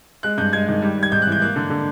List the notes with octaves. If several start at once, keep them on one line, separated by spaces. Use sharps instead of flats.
G#3 F#6
G2 G6
G#3 G#6
D#3
G3
G3
G#6
G#2 G6
F#6
E3 G6
A#3 F#6
D3
D3